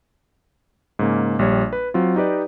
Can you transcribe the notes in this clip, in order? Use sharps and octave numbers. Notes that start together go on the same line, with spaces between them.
G#2 C#3 A#3
A#1 G3 C#5 G#6
B4
F#3 C4 F4
D#4 G4 B4 D5 D#5